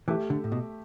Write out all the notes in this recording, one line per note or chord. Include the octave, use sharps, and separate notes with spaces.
E3 A3 G4 E5
D3
A2
B2